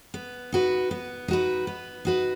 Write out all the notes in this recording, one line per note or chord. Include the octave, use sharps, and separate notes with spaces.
B3
D#4 F#4 B4
B3
D#4 F#4 B4
B3
D#4 F#4 B4